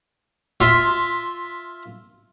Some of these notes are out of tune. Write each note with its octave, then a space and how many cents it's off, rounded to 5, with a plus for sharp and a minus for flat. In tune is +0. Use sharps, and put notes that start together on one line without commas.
F4 +0 E5 +0 C6 +15